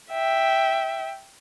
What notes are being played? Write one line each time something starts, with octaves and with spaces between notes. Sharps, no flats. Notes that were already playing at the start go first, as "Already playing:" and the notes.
E5 G5